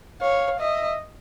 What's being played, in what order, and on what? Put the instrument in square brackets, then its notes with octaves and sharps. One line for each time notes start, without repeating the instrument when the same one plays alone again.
[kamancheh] C#5 [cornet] F5
[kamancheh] D#5 [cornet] E5